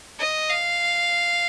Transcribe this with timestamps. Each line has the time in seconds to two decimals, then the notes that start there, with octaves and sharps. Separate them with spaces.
0.20 D#5
0.49 F5